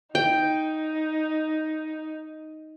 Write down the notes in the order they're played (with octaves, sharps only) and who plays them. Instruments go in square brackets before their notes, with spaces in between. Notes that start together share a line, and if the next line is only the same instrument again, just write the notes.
[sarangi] D#4 [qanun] G5